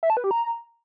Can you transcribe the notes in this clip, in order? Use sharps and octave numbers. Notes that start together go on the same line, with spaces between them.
E5
A5
B4
G4
A#5